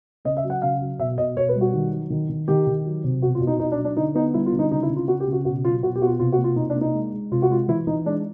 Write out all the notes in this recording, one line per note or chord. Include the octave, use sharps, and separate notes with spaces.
C#3 D#5
E5
F#3
F#5
C#3 F5
F#3
B2 E5
B2 D#5
B2 C#5
B4
G3
F#4
D#3
F#3
D#3
D#3
D#3 G4
D#3
F#3
C3
B2 F#4
F4
B2
D#4
B2 D#4
D4
F#3
D4
D3 D#4
B3 D#4
G3 E4
F4
D3
D#4
C#3 D#4
E4
C#3
F4
C#3 F#4
G4
C#3
F#4
B2 F#4
F#3 F4
B2 F#4
G4
B3 F#4
F4
C3 F4
F#4
A#3
F4
C3 D#4
D4
A#3
D#4
G#3
G#3
C3 F4
F#4
G#3 F4
E3 E4
E3 D#4
G#3 D4